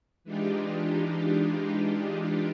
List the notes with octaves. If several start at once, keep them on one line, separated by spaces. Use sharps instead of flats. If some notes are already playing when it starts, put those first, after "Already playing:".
E3 G#3 D4 D#4 F4 G4